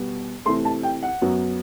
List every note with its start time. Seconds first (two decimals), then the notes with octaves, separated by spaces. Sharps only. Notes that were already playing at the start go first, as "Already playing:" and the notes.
Already playing: B2 G3 B3
0.46 C3 E3 A3 C6
0.65 A5
0.83 G5
1.02 F#5
1.22 F#2 F#3 B3